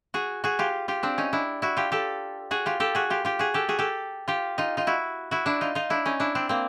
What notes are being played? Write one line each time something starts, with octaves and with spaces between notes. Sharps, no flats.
F#4 G#4
F#4 G#4
F4 G4
F4 G4
C4 D4
C#4 D#4
D4 E4
E4 F#4
F4 G4
G4 A4
F#4 G#4
F4 G4
G4 A4
F#4 G#4
F4 G4
F4 G4
F#4 G#4
G4 A4
F#4 G#4
G4 A4
F4 G4
D#4 F4
D#4 F4
E4 F#4
E4 F#4
D4 E4
D#4 F4
D#4 F4
D4 E4
C#4 D#4
D4 E4
C4 D4
A#3 C4